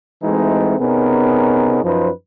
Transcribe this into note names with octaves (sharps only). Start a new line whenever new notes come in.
E3 G#3 A3 C4 D#4 F#4
C3 B3 C#4 D#4 G#4 A#4
F#2 F3 D#4 B4 C5